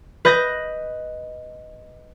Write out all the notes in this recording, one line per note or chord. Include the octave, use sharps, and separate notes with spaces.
B4 D#5 G6 A#6